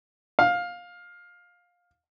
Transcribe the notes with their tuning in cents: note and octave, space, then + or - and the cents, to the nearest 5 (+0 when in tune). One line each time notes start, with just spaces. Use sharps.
F5 +15